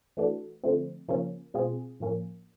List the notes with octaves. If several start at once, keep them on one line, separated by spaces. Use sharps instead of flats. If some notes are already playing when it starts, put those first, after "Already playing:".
E3 A3 D4 F#4
D3 F3 A3 C4
C#3 F3 A#3 C#4
B2 G#3 C4 F4 G#4
A2 F3 A#3 C#4